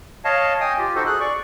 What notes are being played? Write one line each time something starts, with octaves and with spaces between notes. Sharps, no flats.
C#5 D#5 F5 A5
D#5 G5 G#5 D#6
F4 G4
D#4 F#4 A4 C5
G#4 F#6
D5 C#6